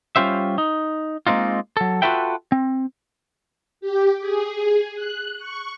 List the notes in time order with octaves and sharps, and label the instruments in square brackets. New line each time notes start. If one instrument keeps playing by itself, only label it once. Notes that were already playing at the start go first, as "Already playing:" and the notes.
[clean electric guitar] G3 C#4 F4 G4 C5 E5
D#4
G#3 A#3 C4 D#4 F4
F#3 A4
F4 F#4 A4 B4 E5 G5
C4
[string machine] G4
G#4
F#6
C#6